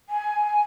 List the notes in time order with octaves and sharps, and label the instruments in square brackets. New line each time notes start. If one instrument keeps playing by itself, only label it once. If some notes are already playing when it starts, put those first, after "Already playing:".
[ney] G#5